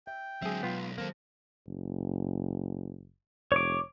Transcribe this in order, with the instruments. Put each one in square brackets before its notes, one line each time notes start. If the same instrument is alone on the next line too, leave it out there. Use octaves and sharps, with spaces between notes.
[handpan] E5 [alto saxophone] G5
[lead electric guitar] D3 C4 [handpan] F#3 G#3 [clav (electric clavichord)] G#4 E5
[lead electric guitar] B1 [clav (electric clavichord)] B3 F4
[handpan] D#3 F#3 C5 [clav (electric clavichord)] A#3 [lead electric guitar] C4 A4
[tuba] F#1
[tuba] F1 [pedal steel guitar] C#5 D6